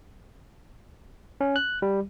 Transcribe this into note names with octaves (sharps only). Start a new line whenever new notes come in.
C#4
F#6
G3